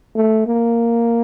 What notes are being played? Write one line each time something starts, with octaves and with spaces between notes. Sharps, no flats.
A3
A#3